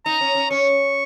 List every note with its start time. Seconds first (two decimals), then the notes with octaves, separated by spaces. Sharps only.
0.06 D#4 A#5
0.21 C#4
0.35 C#4
0.51 C#4 C#6